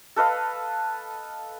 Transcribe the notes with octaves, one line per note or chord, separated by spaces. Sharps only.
A4 B4 D#5 F5